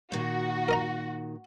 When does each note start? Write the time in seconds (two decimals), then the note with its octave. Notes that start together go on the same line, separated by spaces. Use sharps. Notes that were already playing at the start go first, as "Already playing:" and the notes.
0.12 A#2 D#3 F#4
0.68 A#4 D#5 A#5